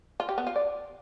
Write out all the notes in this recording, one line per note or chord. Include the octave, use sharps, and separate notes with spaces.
F4
G4
B3
F4
D5